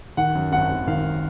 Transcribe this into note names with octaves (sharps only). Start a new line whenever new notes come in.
D#3 F#5
F#2
G#1 F#5
G#1
D#3 F5